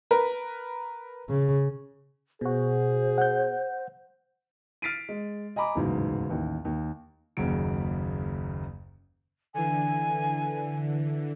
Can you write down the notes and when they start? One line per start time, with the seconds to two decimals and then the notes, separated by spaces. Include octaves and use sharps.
0.11 A#4 B4
1.29 C#3
2.41 B2 F#4 G#4 C5
3.18 F#5 G6
4.82 F6 A6 B6 C7 D7 D#7
5.09 G#3
5.56 D#5 G#5 A#5 B5 D6
5.75 D1 B1 E2 G#2 C#3
6.29 A1 D#2
6.65 D#2
7.37 F#1 D#2 C#3 F#3 D7
9.54 D3 E3 G#5